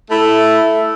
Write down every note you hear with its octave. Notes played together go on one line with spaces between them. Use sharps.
A3 E4